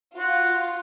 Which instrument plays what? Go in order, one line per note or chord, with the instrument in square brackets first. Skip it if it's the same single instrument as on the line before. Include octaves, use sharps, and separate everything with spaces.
[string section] F4 [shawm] F#4